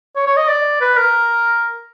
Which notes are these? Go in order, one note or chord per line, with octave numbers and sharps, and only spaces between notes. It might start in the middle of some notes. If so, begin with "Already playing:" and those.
C#5
C#5
D#5
D5
B4
A#4